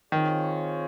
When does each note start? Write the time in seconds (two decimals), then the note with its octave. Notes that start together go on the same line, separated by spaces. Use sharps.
0.12 D#3 C4 F4 G#4 C#5